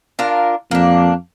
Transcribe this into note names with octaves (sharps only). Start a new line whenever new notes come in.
D4 F4 A#4
F2 A#3 D4